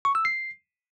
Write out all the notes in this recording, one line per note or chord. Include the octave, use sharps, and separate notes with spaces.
C#6
E6
C7